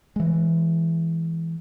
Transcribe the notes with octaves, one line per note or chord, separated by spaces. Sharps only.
E3 G#3